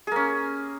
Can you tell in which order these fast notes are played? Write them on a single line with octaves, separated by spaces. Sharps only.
G#4 A#3 C#4